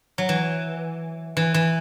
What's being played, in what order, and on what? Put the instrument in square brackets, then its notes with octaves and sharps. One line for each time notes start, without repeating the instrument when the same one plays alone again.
[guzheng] F#3
E3
E3
E3